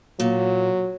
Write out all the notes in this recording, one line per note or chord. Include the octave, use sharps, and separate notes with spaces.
A#2 F#3